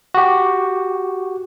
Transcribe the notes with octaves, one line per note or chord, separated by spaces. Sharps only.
F#4 G4